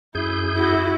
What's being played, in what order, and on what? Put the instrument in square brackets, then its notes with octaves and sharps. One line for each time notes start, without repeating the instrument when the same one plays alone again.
[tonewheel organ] F#2 G#4 G6 [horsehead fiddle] E4
[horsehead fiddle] E4 F#4